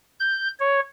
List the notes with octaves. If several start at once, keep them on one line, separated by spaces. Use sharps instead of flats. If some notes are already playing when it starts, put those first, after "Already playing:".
G6
C#5